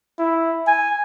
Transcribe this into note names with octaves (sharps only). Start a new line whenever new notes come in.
E4
G#5